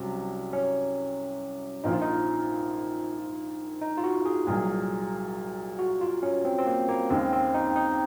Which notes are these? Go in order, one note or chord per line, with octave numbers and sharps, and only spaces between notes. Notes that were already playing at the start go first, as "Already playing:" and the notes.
Already playing: C2 C3 F#3 C#4
C#4
A#1 A#2 F3 D#4
F4
D#4
D#4
F4
F#4
G#4
C2 A#2 F#3 G#4
F#4
F4
C#4
C4
C4
A#3
A#3
D#2 C#3 G#3 C4
C4
D#4
D#4